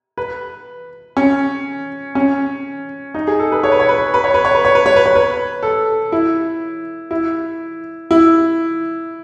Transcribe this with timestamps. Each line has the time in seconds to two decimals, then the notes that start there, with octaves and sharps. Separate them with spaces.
0.18 B4
1.17 C#4
2.15 C#4
3.14 D#4
3.27 G#4
3.39 A4
3.52 B4
3.64 C#5
3.72 B4
3.80 C#5
3.89 B4
4.14 B4
4.24 C#5
4.34 B4
4.45 C#5
4.55 B4
4.65 C#5
4.75 B4
4.86 C#5
4.96 B4
5.06 C#5
5.16 B4
5.63 A4
6.12 E4
7.11 E4
8.11 E4